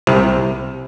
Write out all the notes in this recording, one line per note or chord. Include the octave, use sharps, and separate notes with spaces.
C2 C3